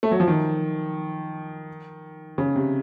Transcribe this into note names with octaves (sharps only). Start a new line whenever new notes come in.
A3
F#3
F3
D#3
C#3
C3